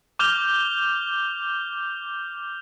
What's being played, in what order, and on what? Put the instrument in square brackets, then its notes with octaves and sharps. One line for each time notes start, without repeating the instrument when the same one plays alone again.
[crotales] D6 F6 G6 F7 G7